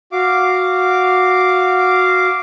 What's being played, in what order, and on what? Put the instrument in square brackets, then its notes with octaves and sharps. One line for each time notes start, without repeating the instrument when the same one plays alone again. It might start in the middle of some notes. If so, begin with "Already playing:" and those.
[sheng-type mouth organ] F#4 F5 D6